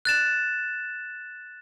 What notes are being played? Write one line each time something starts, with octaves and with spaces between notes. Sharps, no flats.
F#6 A6 E7